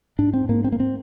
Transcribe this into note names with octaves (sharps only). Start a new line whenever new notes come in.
G#2 D4
C4
G#2 A#3
C4
A#3
C4